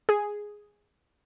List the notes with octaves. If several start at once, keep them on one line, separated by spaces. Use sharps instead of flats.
G#4